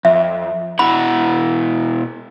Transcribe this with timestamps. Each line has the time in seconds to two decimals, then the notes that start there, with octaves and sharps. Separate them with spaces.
0.05 F2 E5
0.79 B2 E4 F#5 B5